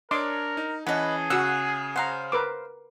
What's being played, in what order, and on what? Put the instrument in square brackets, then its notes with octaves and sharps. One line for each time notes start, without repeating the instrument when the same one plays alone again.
[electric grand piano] D4 C#5 [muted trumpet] A#4 [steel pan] D#5 C6 D6
[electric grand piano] D#4
[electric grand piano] E3 C#4 A5 [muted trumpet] G#4 [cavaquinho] B4 D#5 [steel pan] F#5
[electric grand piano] C#3 [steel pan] F#4 E6 [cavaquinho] F#5
[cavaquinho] C5 F5 [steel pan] F#5 A#5
[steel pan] A#4 B4 D6